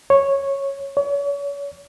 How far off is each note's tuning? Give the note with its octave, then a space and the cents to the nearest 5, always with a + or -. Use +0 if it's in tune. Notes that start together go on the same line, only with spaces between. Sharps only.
C#5 -10
C#5 +35